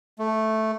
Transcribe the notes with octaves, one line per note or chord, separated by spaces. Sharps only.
A3